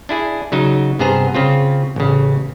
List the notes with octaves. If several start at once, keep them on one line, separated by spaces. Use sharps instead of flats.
D4 E4 G#4
C#3 F#3 D#4
G2 C3 B3 G#4 C5 A#5
C#3 C4 F4
A1 C#3